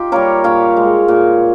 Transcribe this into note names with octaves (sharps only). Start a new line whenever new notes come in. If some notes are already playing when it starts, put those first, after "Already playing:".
Already playing: D#4 F4 G4
G3 A#3 A#4 C#5
A#2 C#5 F5
G#3
A#2